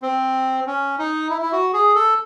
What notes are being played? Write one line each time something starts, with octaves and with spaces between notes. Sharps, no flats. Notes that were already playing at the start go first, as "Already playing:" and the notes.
C4
C#4
D#4
E4
E4
F#4
G#4
A4